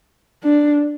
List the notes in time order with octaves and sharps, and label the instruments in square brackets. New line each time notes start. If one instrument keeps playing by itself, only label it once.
[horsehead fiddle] D4